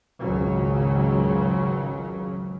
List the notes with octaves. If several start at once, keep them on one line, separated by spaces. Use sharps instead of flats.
G#1 C#2 C#3 F#3